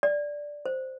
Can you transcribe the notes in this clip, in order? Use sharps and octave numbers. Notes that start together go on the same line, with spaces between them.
D5
C5